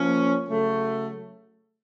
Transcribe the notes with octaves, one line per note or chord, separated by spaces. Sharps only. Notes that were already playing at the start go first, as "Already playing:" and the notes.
Already playing: F3 A#3 C#4
C#3 F#3 A3